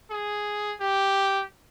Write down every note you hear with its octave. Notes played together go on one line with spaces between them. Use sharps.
G#4
G4